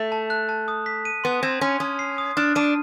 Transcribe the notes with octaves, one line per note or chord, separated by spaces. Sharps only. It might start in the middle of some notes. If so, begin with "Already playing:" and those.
Already playing: A3
A5
F#6
A5
D#6
B6
D#7
B3 C6
C4 G#6
C#4 C6
C#4 D#6
C7
D#6
D4 F6
D4 D#7